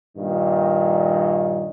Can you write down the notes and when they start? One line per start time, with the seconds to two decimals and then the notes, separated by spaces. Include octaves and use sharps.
0.18 G2 A#2 D#3